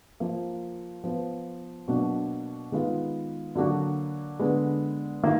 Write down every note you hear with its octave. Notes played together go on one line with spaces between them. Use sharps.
F3 A#3 F4
F3 B3 F4
B2 F#3 A#3 D4 F#4
D#3 G#3 B3 F4
D3 F#3 A#3 D4 F#4
D3 G#3 B3
D#3 A#3 F4